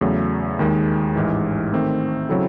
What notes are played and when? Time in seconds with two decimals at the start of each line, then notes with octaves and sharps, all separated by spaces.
0.01 E2 C#3 F#3 A3
0.59 D#2 D#3 G#3
1.16 A1 G#2 E3
1.73 D#3 A3 C4
2.29 C#3 F#3 C4 E4 A4